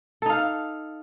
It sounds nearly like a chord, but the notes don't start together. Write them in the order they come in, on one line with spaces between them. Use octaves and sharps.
A4 D#4 F5